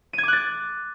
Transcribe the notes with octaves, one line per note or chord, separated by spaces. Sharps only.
D6 F#6 G#6 A6 D#7